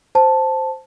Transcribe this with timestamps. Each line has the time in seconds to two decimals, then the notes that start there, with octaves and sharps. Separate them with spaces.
0.15 C5 A5